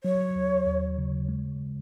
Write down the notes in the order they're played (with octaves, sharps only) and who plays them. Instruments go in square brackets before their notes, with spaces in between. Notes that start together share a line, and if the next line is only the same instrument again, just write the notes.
[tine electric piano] F#3 [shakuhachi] C#5
[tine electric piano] D#2
D#2
C#3
G#3